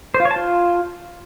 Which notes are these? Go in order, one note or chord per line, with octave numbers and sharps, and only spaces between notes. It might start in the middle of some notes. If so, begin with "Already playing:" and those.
C5
F4
C#5
A5
F4